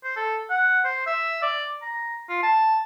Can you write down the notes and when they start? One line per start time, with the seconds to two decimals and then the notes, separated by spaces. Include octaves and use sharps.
0.04 C5
0.16 A4
0.50 F#5
0.85 C5
1.06 E5
1.42 D5
1.82 A#5
2.29 F4
2.43 A5